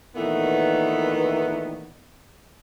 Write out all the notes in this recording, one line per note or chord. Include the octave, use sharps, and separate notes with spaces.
A#2 D#3 E3 A3 B3